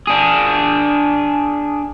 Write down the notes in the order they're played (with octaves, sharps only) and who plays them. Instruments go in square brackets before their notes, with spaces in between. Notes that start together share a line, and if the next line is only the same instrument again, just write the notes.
[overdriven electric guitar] D4 G#4